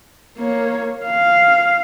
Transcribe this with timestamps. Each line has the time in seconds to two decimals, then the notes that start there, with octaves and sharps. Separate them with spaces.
0.38 A#3 C#5
1.05 F5